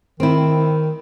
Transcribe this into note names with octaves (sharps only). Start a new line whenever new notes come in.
D#3 C4 E4